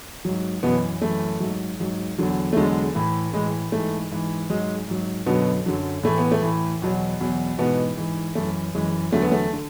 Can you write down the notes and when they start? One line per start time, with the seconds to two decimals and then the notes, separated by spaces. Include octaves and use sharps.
0.25 G#2 F#3
0.63 F#2 B2 E3 B3
1.02 F#2 E3 A3
1.40 G#2 F#3
1.80 G#2 F#3
2.19 E2 D3 F#3
2.53 A3
2.56 E2 D3 F#3 G#3
2.95 A2 E3
3.34 A2 E3 G#3
3.72 G#2 E3 A3
4.11 G#2 E3
4.50 G#2 F#3 G#3
4.88 G#2 F#3
5.26 F#2 B2 D3 F#3 B3
5.66 F#2 D3 F#3
6.04 A2 E3 A3
6.18 B3
6.32 A3
6.42 A2 E3
6.82 E2 B2 F#3
7.20 E2 B2 F#3
7.58 G#2 B2 E3 B3
7.97 G#2 E3
8.35 F#2 E3 A3
8.75 F#2 E3 G#3
9.12 E2 D3 F#3 A3
9.22 B3
9.32 A3
9.53 D3